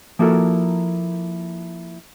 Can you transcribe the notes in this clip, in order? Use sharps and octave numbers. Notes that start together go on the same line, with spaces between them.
F3 A#3 E4 F#4 A4 A#4